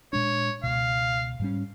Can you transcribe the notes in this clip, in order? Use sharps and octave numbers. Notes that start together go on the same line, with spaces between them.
A#2 G#3 D4 C#5
C#2 B2 F5
G#2 G3 C#4